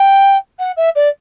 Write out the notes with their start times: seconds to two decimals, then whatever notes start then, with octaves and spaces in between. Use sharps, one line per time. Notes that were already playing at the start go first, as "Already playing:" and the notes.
Already playing: G5
0.59 F#5
0.77 E5
0.96 D5